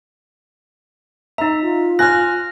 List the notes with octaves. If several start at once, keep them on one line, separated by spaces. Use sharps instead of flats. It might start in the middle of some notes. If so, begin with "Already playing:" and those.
D#4 E5 A#5
F4
G#5 F6 F#6 A#6